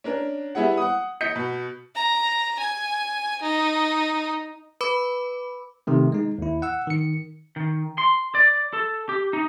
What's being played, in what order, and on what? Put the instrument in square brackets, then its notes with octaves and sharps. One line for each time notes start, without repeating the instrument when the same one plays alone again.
[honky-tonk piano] C#4 D4 A#4
G3 B3 E4 G#4 F#5
F#5 D#6
D#5 G6 B6 C#7
B2
[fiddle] A#5
G#5
D#4
[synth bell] B4 B5 D6
[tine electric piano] C3 D#3 A3
G#3 D#4
D#2 E4
F#5 E6
D#3 C#7
[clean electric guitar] D#3
C6
D5
A4
G4
D#4